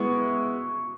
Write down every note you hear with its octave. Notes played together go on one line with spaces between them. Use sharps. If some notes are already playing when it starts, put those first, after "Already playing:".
Already playing: G#3 B3 E4 C#6